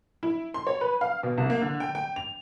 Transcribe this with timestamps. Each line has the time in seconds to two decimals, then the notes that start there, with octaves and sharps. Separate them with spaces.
0.23 E4
0.54 C6
0.67 C#5
0.81 B4
1.01 F5
1.23 B2
1.38 C2
1.50 A#3
1.61 D3
1.80 G5
1.95 G5
2.16 F7